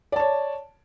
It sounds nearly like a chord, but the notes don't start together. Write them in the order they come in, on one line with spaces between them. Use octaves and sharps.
D5 A5 C#5